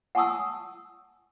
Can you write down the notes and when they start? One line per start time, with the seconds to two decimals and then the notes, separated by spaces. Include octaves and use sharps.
0.15 F#5 G#5 A5 C#6 D#6 E6